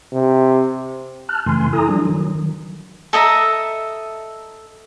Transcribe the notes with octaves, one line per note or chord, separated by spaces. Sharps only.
C3
A5 F6 F#6
F#2 C#3 E3 A3 G#5 C6
E4 A4 G#5 A#5 D#6
F3 G3 D4
D#3 F#3
D#3
A4 D#5 E5 A#5